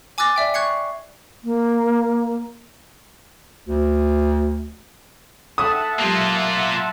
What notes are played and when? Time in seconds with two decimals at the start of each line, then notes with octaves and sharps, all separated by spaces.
0.18 G#5 D6 E6 F#6 A6 A#6
0.36 D5 E5 G5
0.54 C#6 F#6 G#6 C7 C#7
1.44 A#3
3.68 D2
5.58 A4 E5 F#5 G5 A5 D#6
5.99 F#3 G#3 A#3 F4 G4